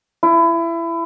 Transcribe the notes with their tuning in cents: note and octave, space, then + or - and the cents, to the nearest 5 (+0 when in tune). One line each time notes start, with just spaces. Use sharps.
E4 +25